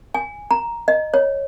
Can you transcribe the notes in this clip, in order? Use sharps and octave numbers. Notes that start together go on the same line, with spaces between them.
G#5
A#5
D#5
C#5